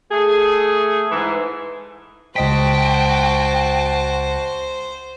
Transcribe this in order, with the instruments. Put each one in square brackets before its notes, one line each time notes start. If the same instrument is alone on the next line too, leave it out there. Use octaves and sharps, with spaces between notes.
[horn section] A3 G#4
G#2 E3
[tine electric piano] C#2 D#5 B6 [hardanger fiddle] F#4 A5 [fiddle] C5 [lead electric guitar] G5